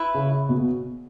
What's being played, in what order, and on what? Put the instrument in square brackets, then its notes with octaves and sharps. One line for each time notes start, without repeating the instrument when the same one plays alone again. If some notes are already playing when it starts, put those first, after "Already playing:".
Already playing: [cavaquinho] E4 B4 E5
[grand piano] C#3
B2